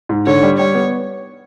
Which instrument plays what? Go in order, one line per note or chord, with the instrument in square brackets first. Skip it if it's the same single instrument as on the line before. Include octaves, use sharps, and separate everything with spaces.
[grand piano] G#2
[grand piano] D3 [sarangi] C#5
[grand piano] G3
[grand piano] G3 [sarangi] C#5
[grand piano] B3